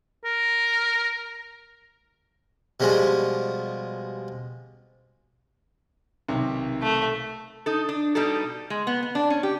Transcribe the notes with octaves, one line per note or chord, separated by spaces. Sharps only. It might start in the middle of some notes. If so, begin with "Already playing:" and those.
A#4
B2 F3 G3 G#3
B1 C3 D#3
A3
D#4 A4
D4
B2 G3 D#4 G4 A4
G#3
B3
B3
D4
C#4
G4